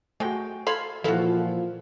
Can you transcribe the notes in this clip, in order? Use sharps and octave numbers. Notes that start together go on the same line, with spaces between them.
G#3 A3 F#4 G5
A4 F5 B5 C6 G#6
A#2 E3 F3 E4 F#4 A4 F5